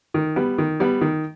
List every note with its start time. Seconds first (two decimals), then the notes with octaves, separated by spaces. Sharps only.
0.14 D#3
0.36 G3 B3
0.58 D#3
0.80 G3 B3
1.01 D#3